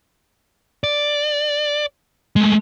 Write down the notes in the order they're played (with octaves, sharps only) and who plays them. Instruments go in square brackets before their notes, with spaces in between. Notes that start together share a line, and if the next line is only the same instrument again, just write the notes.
[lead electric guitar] D5
G#3 A3